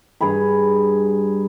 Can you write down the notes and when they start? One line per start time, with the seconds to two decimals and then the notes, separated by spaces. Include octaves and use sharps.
0.21 G2 G#4 A#5 B5